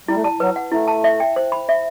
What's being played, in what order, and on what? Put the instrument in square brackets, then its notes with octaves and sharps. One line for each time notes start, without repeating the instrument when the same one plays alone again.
[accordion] G3 [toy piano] E4
[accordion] A3
[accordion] G3 [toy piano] A5
[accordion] F#3 [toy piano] B4
[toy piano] F#5
[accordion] A3 [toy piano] E4
[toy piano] A5
E5
G5
C5
B5
E5